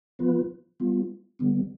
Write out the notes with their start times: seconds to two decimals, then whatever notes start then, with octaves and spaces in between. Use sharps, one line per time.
0.19 F3 B3 F4 B4
0.80 G3 B3 F4
1.39 D3 G3 B3